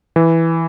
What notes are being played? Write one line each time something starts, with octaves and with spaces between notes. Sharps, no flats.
E3